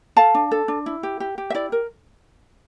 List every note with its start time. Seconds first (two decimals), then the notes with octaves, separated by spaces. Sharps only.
0.17 A4 F5 A5
0.35 D4
0.51 A4
0.68 D4
0.86 E4
1.03 G4
1.20 G4
1.38 G4
1.50 E5
1.55 E4 D5
1.72 A#4